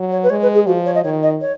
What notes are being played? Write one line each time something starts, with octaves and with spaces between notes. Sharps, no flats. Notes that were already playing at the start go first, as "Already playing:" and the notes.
Already playing: F#3
C#5
B4
G#3 C#5
B4
G#4
F3 F#4
C#5
D#5
D#3 C#5
D#5
C#5